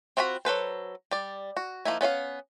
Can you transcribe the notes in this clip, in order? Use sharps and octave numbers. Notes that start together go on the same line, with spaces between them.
C4 F4 F#4 C#5 B5
F#3 A4 B4 C5
G3 D5
F#4
F3 A3 A#3 D#4 E4
B3 C#4 E5 F5